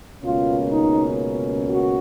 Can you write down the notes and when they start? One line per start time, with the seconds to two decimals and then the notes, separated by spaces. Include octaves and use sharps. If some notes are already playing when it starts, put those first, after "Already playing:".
0.21 C#2 B2 A#3 C#4 F4
0.71 D#4
1.69 F#4